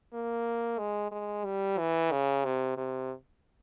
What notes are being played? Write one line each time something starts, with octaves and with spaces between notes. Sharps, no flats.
A#3
G#3
G#3
G3
E3
C#3
C3
C3